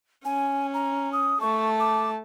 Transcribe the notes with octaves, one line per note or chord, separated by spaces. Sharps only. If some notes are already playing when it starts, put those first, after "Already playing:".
C#4 G#5
A#5
D#6
A3 A5 C#6
D6